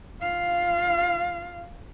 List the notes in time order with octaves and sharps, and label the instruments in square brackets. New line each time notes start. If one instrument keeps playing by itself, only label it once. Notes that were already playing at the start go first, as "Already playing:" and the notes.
[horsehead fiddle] F4 F5